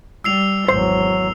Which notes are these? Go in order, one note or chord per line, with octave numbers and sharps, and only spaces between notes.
G3 E6 C7 F7
G#1 E2 F#3 C5 C6